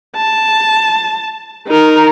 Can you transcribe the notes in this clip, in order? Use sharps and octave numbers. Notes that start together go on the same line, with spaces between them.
A5
D#4 A#4